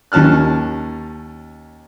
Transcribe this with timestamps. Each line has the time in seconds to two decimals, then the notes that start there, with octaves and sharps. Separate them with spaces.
0.12 D#2 C#4 A5 F6 F#6